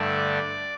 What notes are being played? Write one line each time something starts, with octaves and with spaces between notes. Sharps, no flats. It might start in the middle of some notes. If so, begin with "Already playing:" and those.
Already playing: G2 D3 A3 D4
D5